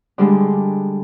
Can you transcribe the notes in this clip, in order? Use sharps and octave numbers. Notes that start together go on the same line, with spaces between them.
D3 G3 G#3